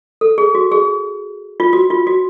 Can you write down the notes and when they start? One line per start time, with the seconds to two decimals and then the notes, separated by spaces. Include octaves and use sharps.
0.21 A4
0.38 G#4
0.55 F#4
0.72 G#4
1.60 F4
1.73 F#4
1.90 F4
2.07 F#4